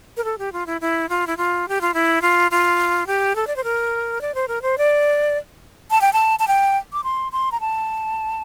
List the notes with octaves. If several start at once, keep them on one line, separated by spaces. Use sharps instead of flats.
A#4
A4
G4
F4
E4
E4
F4
E4
F4
G4
F4
E4
F4
F4
G4
A4
D5
C5
A#4
D5
C5
A#4
C5
D5
A5
G5
A5
A5
G5
D6
C6
C6
A#5
A5